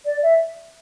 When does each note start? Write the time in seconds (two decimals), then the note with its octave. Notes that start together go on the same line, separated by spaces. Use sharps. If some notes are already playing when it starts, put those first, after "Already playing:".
0.05 D5
0.23 E5